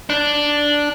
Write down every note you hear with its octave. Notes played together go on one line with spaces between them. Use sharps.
D4